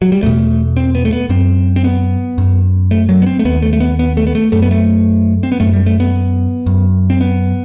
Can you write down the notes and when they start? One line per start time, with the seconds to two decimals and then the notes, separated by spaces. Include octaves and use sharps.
0.02 F#3
0.12 G3
0.23 E2 B2 A3
0.77 C4
0.95 B3
1.05 A3
1.13 B3
1.29 F#2 C4
1.76 C4
1.84 B3
2.38 F#2
2.91 A3
3.09 F#3
3.22 B3
3.26 C4
3.39 A3
3.45 D#2 B3
3.62 A3
3.73 A3
3.80 B3
3.99 B3
4.17 A3
4.27 B3
4.35 A3
4.52 F#2 A3
4.62 B3
4.71 A3
5.43 C4
5.52 B3
5.60 F#2 A3
5.73 G3
5.86 A3
6.00 B3
6.67 F#2
7.10 C4
7.21 B3